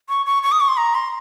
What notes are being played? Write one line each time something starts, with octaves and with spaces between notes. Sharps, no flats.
C#6
C#6
C#6
D#6
C#6
C6
A#5
C6